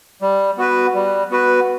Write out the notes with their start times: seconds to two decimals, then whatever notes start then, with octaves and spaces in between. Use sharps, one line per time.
0.22 G3
0.57 B3 F#4 B4
0.94 G3
1.30 B3 F#4 B4